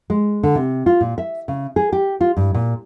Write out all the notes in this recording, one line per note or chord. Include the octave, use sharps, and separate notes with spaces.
G#3
D3
C3
F4
A#2
E5
C#3
G#4
G4
F4
G2
A#2